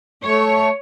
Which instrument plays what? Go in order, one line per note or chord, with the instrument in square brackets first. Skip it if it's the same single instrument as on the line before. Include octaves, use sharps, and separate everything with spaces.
[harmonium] A3 [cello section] C#5